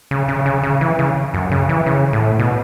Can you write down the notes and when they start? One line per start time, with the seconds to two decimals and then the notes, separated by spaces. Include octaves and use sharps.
0.11 C#3
0.28 C#3
0.46 C#3
0.63 C#3
0.81 E3
0.99 C#3
1.34 F#2
1.51 C#3
1.69 E3
1.86 C#3
2.13 A2
2.39 B2